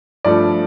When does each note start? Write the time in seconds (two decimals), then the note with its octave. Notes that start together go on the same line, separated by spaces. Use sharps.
0.25 G2 F3 A3 D5